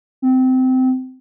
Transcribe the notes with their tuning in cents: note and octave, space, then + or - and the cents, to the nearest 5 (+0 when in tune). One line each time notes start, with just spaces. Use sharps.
C4 -20